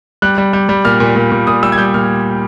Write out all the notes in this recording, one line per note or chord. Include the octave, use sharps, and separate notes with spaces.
G3 F#6
G3
G3
G3
A#2 F6
A#2
A#2
A#2
A#2 D#6
G3 E6
G#6
G3 G6
A#2 F6